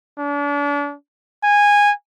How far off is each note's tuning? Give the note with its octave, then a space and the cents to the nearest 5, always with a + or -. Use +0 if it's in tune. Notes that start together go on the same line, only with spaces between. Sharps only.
D4 -35
G#5 -15